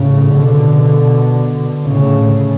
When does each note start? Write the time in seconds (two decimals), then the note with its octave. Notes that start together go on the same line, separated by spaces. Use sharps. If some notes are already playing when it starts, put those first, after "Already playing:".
Already playing: A2 C#3
0.34 B2 D3
1.86 A2 C#3